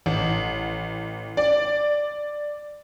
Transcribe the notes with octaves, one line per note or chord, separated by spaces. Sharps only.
A1
D5